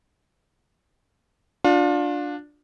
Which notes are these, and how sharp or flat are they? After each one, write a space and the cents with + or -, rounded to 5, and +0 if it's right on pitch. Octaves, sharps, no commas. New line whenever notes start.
D4 +0 F4 +30